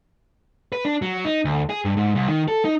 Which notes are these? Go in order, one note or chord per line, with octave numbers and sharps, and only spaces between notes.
B4
D4
F#3
D#4
D2
G#4
G2
G#2
C2
D#3
A4
D#4